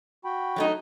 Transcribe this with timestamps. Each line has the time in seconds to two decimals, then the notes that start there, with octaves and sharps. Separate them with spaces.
0.25 F#4 G5 B5
0.56 F#3 A3 D#4